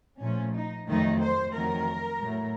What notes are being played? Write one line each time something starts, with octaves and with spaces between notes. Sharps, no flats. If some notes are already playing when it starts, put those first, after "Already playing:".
A#2 F3 A3 C#4
D#4
F2 D#3 F#3 A3 D#4
C5
F2 D#3 F#3 A3 A#4
A2 F#3 A3